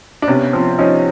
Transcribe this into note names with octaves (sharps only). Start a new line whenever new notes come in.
D4
C3 B3 C#4
F3 C4
F3 C#4 D#4